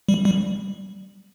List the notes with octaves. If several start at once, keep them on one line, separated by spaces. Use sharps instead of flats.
G3
G3